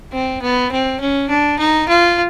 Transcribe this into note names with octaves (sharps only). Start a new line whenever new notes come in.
C4
B3
C4
C#4
D4
D#4
F4